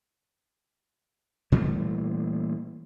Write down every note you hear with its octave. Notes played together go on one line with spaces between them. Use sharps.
A#2 E3 G3 A3